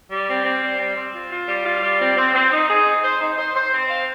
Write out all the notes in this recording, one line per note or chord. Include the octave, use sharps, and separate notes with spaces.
G3
C4
C4
G3
C4
C4
F4
F4
G3
F4
G3
C4
C4
C4
D#4
G#4
D#4
C5
D#4
C5
C5
C4
F5